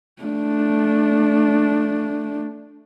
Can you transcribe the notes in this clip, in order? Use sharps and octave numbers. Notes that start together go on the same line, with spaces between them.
A3 D4